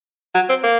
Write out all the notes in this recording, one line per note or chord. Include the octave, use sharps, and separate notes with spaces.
F#3
C4
A#3